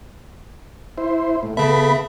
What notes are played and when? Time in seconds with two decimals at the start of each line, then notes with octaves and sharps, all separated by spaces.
0.98 E4 C5
1.43 A2
1.57 C#3 B3 A4 E5 B5